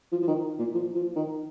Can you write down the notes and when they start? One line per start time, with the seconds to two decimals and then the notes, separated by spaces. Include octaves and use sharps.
0.12 F3
0.22 F3
0.28 D#3
0.59 A#2
0.74 F3
0.95 F3
1.16 D#3